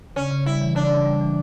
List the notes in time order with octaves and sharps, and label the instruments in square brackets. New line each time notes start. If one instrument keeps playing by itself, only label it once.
[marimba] C#3 [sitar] C#4
[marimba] C#3
[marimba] G3 [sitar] E4
[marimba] E3
[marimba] C#3 [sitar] D4
[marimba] C#3
G3
E3